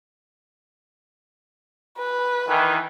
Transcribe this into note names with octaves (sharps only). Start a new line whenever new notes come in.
B4
D#3 E3